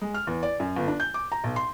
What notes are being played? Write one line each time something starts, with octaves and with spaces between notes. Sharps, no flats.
G#3
F6
E2
D5
F#2
G1
D4
G6
D6
A#5
B1
C6